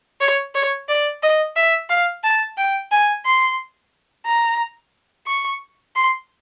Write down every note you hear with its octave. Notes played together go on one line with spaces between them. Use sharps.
C#5
C#5
D5
D#5
E5
F5
A5
G5
G#5
C6
A#5
C#6
C6